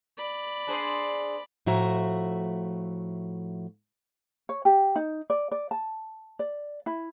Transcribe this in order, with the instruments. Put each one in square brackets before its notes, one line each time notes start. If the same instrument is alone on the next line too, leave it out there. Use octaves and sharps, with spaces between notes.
[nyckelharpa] D5 B5
[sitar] D4 G#4 C5
[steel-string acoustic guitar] A2 F3 A3 F#4 E5 A#5
[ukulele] C#5
G4
D#4
D5
D5
A5
D5
E4